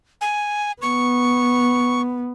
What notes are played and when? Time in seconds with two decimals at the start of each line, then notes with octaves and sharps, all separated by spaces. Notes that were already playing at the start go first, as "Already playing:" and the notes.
0.21 G#5
0.82 B3 C#6